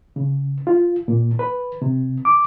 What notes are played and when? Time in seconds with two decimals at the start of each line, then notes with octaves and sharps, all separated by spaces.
0.16 C#3
0.67 F4
1.08 A#2
1.39 B4
1.82 C3
2.25 D6